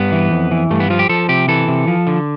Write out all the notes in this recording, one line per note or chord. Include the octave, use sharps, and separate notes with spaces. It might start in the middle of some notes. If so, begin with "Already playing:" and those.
Already playing: G2 B3
E3
F2
E3
G2 A3
B3
F3 F4
G4
F3 A4
C3 G4
E3 A4
C3
F3
D3